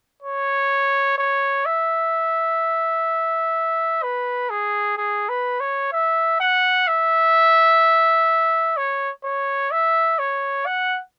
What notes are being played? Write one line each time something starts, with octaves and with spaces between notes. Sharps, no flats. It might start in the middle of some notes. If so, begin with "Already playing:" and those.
C#5
C#5
E5
B4
G#4
G#4
B4
C#5
E5
F#5
E5
C#5
C#5
E5
C#5
F#5